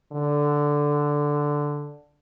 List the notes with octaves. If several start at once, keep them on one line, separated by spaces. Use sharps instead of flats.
D3